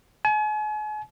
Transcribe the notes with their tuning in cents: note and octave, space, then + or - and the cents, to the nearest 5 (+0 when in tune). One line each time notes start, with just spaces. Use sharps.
G#5 +40